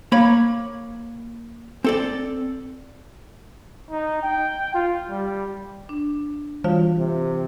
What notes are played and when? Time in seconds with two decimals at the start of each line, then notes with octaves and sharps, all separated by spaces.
0.12 A#3 C#5 B5
1.84 C4 A4 D5
3.91 D#4
4.23 G5
4.74 F4
5.10 G3
5.89 D4
6.64 E3 F4 F#4 F5
6.98 C3